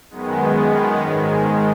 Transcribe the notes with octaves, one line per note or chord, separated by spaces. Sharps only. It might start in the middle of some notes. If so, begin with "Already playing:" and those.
F#2 D#3 G#3 B3
G#2 D#3 G#3